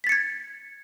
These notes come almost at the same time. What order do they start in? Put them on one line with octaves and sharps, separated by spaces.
B6 A6 C#7 G#6